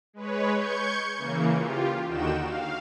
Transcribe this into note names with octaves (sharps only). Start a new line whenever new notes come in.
G#3 B4 C#5
C#6 G6 G#6 C#7
C#3 E3 A#3
F4 G4
D#2 D3 D#4 F#4 G5 E7
F5